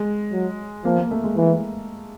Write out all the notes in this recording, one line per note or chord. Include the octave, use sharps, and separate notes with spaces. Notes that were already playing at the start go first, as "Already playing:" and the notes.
Already playing: G#3
F#3
F3 A#3
A#3
A3
G#3
E3